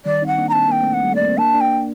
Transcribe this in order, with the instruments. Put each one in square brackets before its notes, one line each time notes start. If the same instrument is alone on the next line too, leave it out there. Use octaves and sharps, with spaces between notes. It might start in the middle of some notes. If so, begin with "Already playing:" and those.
[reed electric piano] D#3 G3 [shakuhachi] D5
[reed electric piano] C4 D#4 [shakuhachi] F#5
[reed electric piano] A#3 D4
[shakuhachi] A#5
[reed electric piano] C4 [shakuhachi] A5
[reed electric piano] A#3 [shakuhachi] G5
[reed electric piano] A3 C4
[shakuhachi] F#5
[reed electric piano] G3
[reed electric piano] A3 [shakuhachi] D5
[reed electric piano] A#3
C4
[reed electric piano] A#3 D4 [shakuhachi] A5
[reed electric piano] A#3 D4
[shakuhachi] G5